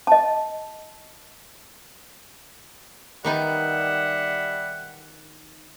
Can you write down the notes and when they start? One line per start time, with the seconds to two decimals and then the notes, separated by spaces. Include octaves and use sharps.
0.07 D#5 A5
3.25 D#3 G3 B3 D#4 E5 F#5